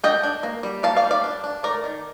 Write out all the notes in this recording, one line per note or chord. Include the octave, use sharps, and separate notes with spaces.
D4 D#5 G5
D4
A#3
G3
A#3 F5 A5
D5 F5
G3
D5 F5
D4
D4
A3 A#4 D5
D#3